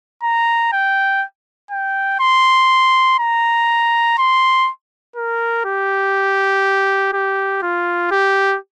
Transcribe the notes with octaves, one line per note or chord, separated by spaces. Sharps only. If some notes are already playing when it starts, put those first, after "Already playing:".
A#5
G5
G5
C6
A#5
C6
A#4
G4
G4
F4
G4